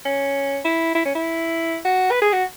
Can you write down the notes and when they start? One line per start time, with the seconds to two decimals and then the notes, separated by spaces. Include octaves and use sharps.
0.05 C#4
0.65 E4
0.95 E4
1.06 C#4
1.16 E4
1.85 F#4
2.11 B4
2.22 G#4
2.33 F#4